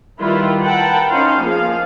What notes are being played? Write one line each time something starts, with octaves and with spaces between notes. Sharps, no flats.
D#3 G3 E4 F4 A#4 B4
A#4 B4 F#5 G5 A5
C#4 D#4 C5 F5
F3 A#3 G#4 F5